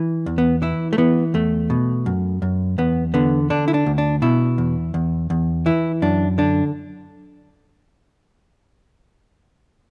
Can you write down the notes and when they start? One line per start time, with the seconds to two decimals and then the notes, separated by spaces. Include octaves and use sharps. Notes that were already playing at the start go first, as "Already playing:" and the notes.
Already playing: E3
0.26 E2
0.38 B3
0.62 E3 E4
0.93 A3
0.98 E3 B3
1.34 E2 A3
1.70 B2
2.06 F#2
2.42 F#2
2.78 E2 B3
3.14 D3 B3
3.50 D3 D4
3.68 E4
3.74 D4
3.86 D2
3.98 D4
4.22 B2 E4
4.58 E2
4.94 E2
5.30 E2
5.66 E3 E4
6.02 F#2 D4
6.38 D3 D4